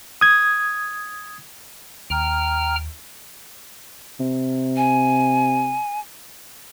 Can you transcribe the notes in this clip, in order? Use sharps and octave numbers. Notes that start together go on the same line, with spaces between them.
D#6 G#6
D#2 G5 A#5 F6
C3
G#5